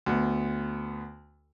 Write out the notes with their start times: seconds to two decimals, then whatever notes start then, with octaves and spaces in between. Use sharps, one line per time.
0.06 D2 B3